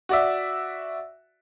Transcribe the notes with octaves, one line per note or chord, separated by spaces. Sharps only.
F#4 D5 E5